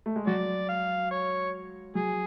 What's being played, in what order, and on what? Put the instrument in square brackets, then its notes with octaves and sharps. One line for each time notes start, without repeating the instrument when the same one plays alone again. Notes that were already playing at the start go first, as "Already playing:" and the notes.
[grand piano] A3
G#3
[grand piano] F#3 [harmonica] F#4 D5
[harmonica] F5
C#5
[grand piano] F#3 [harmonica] G#4